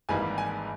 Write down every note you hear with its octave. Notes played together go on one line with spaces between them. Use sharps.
G#1 G#2 E3 G3 A#3 G#5
G#5